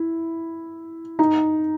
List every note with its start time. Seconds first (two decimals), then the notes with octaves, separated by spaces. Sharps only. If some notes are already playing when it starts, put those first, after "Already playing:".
Already playing: E4
1.19 D#4